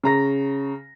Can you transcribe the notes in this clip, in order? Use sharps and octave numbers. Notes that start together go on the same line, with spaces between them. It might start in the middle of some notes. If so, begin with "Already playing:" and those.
C#3 A#5 A#6